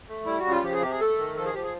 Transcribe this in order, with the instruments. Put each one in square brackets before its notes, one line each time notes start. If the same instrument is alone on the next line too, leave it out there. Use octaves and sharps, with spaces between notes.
[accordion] A3
G3 E4
F#4
C#3
F4
F3 G4
G#4
C3 G4
G#4
A3 A4
D#3
F3 A4
G#4
F3 G4
G#4